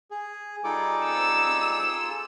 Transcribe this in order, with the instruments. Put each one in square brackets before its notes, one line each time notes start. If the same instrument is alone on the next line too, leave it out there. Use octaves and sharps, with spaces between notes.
[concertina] G#4
[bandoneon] G3 D#4 D6 [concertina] F4 G#4 A4
[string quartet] E6